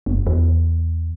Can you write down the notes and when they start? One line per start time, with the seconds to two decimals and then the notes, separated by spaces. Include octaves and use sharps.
0.06 F#1
0.27 E2